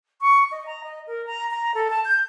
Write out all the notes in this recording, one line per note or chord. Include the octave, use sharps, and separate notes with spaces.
C#6
D#5
A#5
D#5
A#4
A#5
A#5
A4
A5
G6